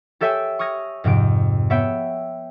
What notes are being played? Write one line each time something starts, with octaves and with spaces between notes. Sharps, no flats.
G4 A4 C#5 E5 G5 G#5
C#6 D#6 F6 G#6 A#6
F2 G#2 C3 D7
B3 C#5 E5 G5